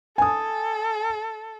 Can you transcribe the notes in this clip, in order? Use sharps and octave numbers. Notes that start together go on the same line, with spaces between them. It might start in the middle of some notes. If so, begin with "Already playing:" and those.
A4 G#5 D#6